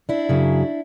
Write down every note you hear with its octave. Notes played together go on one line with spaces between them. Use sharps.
D4 E4
F#2 C#3 F#3